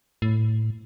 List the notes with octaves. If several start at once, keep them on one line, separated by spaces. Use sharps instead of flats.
A2